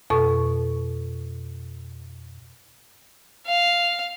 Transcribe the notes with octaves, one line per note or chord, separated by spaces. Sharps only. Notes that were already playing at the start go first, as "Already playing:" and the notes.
F2 B2 A4 C#6
F5